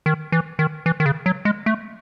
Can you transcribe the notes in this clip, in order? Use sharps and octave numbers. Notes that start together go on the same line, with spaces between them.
D#3
E3
D#3
E3
D#3
C#3
F#3
G#3
A3